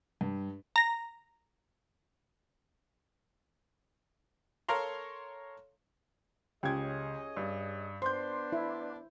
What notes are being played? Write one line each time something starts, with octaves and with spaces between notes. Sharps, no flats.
G2
A#5 A#6
A4 A#4 C#5 F5 A#5 C6
C#2 C#4 G4 G#4 C#5 D#5 G5 G#6
G2
B3 D4 C5 C6 G6
E4